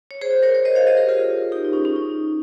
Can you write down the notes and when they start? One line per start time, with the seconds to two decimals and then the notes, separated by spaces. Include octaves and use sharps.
0.11 C#5
0.21 G#4 C5
0.43 A#4 C#5
0.55 C#5
0.65 C5 D#5
0.75 C#5 F5
0.87 C5 D#5
0.97 G4 A#4
1.09 F4 G#4
1.52 D#4 G4
1.65 D#4
1.73 C#4
1.85 C#4
1.96 D#4